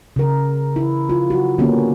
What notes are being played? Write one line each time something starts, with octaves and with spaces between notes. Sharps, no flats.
C#3 A#4
E4
F4
F#4
D3 A#3 B3 C#4 G4